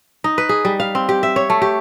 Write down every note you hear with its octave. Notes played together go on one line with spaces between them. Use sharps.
D#4
B4
G#4
G3
F5
C4
G4
E5
C#5
A3
G4